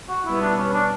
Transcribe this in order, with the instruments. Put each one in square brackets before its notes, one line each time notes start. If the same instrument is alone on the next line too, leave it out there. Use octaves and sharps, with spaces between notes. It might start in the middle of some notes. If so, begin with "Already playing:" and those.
[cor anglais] F#4
[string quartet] B2 G3 B3 [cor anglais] E4
[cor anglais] D4
C#4
D4